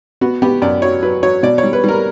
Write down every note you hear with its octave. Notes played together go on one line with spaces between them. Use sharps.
B3 F#4
B3 G4
F#2 D5
F#3 C#5
F#3 B4
F#3 C#5
B2 D5
C#5
G3
B4
G3 A#4